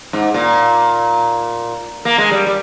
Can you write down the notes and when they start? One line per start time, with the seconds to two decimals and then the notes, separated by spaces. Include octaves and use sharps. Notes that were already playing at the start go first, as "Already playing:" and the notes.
0.13 G#2
0.34 A#2
2.05 A#3
2.18 G#3
2.31 G3
2.46 G3